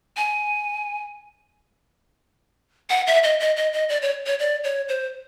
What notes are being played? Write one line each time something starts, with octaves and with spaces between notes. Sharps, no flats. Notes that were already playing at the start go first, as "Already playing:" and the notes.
G#5
F#5
E5
D#5
D#5
D#5
D#5
D5
C#5
C#5
D5
C#5
C5